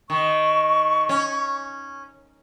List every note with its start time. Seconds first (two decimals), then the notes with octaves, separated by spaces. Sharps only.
0.10 D#3 C#6
1.09 C#4